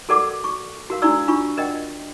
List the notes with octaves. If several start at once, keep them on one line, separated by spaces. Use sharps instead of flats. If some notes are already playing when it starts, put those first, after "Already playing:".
F#4 A4 A#4 D5 F#5 D6
C#6
F#4 A#4 F5
D4 E4 F#4 D5 E6
D4 F4 C#6
A#4 D5 D#5 F#5 G5